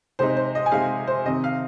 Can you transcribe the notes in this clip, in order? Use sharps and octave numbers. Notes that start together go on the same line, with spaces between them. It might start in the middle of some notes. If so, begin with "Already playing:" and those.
C3 G#3 D#4 C5
C5
D#5
G#5
C3 G#3 D#4 F5
C5
C3 D#3 C4 D#4 D#5
F5